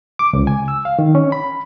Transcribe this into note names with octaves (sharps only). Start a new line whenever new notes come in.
D6
C#2
G#5
E6
F5
D#3
C#4
B5